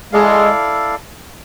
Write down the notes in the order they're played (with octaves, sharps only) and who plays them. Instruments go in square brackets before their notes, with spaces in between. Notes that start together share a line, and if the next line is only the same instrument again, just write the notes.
[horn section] G#3 [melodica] E4 A4 D5 F5